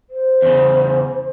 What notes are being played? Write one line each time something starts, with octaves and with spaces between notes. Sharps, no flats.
C5
E2 C#3